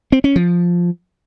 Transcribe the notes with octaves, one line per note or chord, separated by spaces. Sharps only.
C4
C#4
F3